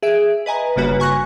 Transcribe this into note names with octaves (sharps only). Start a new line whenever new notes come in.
G#4 E5 D7
B4 D#5 G#5 A#5
G1 C#3 A#3 F#4 B4
G#5 C#6 F#6 A#6